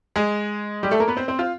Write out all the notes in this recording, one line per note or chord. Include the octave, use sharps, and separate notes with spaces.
G#3 G#4
G3 G4
A3 A4
A#3 A#4
B3 B4
C4 C5
C4 C5
F4 F5